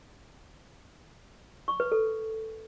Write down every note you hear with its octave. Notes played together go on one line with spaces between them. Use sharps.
C#6
B4
A4